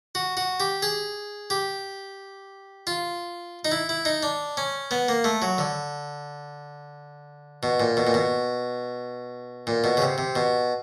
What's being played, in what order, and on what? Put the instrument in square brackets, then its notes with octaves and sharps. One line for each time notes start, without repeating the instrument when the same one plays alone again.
[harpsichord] F#4
F#4
G4
G#4
G4
F4
D#4
E4
E4
D#4
D4
C#4
B3
A#3
A3
F#3
D3
B2
A#2
B2
A#2
B2
A#2
B2
C#3
C3
C3
B2